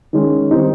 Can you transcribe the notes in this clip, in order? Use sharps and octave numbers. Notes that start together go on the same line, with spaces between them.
D#3 G#3 C#4
D#3 G3 C4 D#4